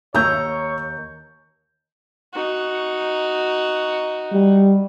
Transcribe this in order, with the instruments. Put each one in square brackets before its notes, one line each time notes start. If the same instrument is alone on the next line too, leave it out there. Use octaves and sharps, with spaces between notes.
[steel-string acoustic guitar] D#2 A#5 [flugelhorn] C#5 [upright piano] E6 G6
[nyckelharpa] D#4 F#4
[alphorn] G3